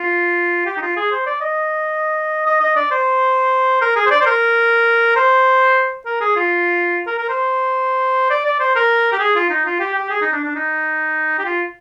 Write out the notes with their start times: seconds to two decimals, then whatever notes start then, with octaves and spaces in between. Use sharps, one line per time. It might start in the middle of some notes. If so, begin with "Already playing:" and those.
Already playing: F4
0.66 G4
0.77 D#4
0.82 F4
0.96 G#4
1.11 C5
1.26 D5
1.41 D#5
2.46 D#5
2.60 D#5
2.76 D5
2.91 C5
3.81 A#4
3.96 G#4
4.06 C5
4.10 D5
4.21 C5
4.26 A#4
5.16 C5
6.06 A#4
6.21 G#4
6.36 F4
7.06 A#4
7.18 A#4
7.29 C5
8.30 D5
8.45 D5
8.60 C5
8.75 A#4
9.12 G4
9.19 G#4
9.35 F4
9.49 D#4
9.65 F4
9.79 G4
9.94 G4
10.10 G#4
10.21 D#4
10.32 D4
10.44 D4
10.55 D#4
11.38 G4
11.45 F4